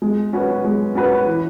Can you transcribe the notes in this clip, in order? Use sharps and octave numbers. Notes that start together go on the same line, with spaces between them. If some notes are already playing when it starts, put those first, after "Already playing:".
G#3
C#4 F#4 B4
G#3
C#4 F#4 B4
E3